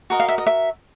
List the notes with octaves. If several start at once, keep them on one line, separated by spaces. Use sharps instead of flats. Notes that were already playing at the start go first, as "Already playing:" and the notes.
F#4 A#4 D#5
F5
E5
D#5
E5